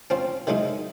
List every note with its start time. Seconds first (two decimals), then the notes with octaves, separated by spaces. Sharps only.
0.10 F3 C4 C#4
0.47 D#3 F#3 G#3 D#4 E4